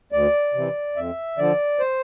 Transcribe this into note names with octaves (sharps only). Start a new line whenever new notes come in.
D2 D5
C3 E3
F2 E5
D3 F3 D5
C5